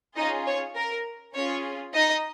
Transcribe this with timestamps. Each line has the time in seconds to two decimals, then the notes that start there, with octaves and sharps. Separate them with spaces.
0.16 C#4 D#4 F4 G#4 D#5
0.46 C#5
0.76 A#4
1.34 C#4 F4 G#4 C#5
1.94 D#4 D#5